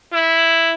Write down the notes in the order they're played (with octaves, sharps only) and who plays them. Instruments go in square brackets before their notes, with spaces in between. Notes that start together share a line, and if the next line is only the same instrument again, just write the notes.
[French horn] E4